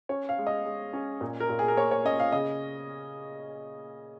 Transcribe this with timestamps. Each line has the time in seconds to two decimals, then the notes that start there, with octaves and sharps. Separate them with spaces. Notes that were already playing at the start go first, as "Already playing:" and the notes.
0.09 C#4 C#5
0.29 F5
0.38 G#3
0.47 D#5
0.66 G#3
0.93 C#4
1.21 A#2
1.40 A#4
1.49 A#2
1.59 G#4
1.68 A#4
1.77 A#3 C#5
1.91 C#5
2.05 C#4 D#5
2.20 F5
2.32 C#3 D#5